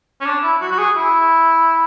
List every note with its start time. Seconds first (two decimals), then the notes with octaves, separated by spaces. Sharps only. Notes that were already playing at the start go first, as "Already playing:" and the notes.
0.21 C#4
0.26 D4
0.43 E4
0.61 F#4
0.71 F#4
0.78 G#4
0.96 E4